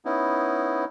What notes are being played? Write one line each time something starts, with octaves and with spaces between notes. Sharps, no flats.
B3 C#4 D#4 E4